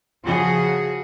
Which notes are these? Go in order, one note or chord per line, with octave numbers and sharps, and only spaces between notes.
C#3 F3 F#4 G#4